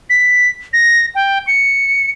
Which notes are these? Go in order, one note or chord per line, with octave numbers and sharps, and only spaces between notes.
B6
A#6
G5
C#7